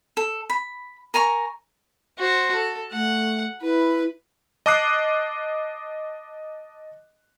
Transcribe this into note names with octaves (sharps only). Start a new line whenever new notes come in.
A4
B5
A#4 G#5 A#5 C#6
F#4 C5
A4
A3 F#5
E4 B4
D#5 A5 D6 D#6 F#6 C7